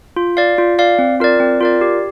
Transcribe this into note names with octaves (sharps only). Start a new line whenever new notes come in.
F4
D5 F5
F4
D5 F5
C4
F4 A#4 D5
C4
F4 A#4 D5
G4